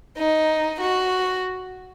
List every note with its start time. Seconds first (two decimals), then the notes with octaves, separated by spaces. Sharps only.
0.18 D#4
0.81 F#4